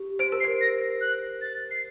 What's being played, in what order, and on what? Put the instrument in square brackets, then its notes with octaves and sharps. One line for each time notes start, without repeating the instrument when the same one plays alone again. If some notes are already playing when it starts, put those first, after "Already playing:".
Already playing: [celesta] G4
[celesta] C5 [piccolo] D7
[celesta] A#4
[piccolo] C7
[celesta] C5
[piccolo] A#6
F#6
A6
C7